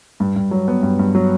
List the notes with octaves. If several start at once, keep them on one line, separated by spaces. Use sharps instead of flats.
G2
G2
F#3
B3
G2
G2
F#3